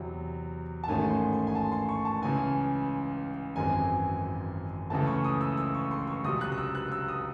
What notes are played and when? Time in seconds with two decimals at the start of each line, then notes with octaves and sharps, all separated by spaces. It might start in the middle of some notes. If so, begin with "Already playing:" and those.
Already playing: E2 C3 F#3
0.84 A5
0.88 A1 G#2 D#3 A3 C#4 G#5
1.10 C6
1.33 C6
1.47 G#5
1.55 A5
1.72 C6
1.89 C#6
2.05 A5
2.22 C#2 C#3 E3 G#5
3.56 G#1 F#2 E3 G#3 C4 G#5
4.90 C#2 C#3 E3 A3 A5
5.07 C#6
5.24 D#6
5.41 E6
5.57 E6
5.74 C#6
5.91 C6
6.07 C#6
6.24 C#2 C3 F#3 D#6
6.41 F#6
6.52 F#6
6.58 E6
6.75 F#6
6.92 E6
7.08 D#6